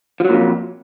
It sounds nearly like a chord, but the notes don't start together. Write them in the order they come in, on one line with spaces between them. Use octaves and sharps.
F3 F#3 A#2 F2